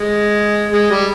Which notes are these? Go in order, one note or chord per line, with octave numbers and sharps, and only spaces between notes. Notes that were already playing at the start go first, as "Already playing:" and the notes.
Already playing: G#3
G#3
G3